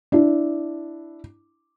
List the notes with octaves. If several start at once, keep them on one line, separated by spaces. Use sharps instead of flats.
D4 E4